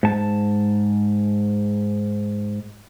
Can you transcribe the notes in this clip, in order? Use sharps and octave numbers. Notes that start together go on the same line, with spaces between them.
G#2 A5